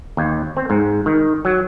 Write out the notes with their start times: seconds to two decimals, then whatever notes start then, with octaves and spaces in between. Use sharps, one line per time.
0.17 D#2
0.57 C4
0.70 G#2
1.06 D#3
1.45 F#3